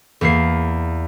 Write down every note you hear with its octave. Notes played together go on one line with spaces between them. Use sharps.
E2 A#3 C7